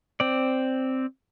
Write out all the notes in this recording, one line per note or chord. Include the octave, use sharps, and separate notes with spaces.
C4 D5